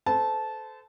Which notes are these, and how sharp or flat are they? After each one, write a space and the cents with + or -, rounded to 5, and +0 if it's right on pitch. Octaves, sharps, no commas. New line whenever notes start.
A4 -20 C5 -35 A5 -15